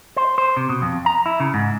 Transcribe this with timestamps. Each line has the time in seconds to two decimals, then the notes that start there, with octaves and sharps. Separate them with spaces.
0.16 C5
0.38 C5
0.57 C3
0.69 B2
0.82 F2
1.06 A#5
1.26 E4
1.40 C#3
1.54 G#2